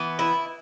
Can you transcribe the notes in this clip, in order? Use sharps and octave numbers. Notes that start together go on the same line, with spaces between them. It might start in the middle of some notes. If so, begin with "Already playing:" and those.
Already playing: E3 B3
E4